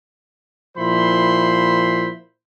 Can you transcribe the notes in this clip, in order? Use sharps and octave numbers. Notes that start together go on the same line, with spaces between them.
A#2 F3 E4 C5 B5 C6